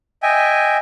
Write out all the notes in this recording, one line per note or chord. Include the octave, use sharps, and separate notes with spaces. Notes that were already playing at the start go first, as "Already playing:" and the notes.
D#5 E5 G5 G#5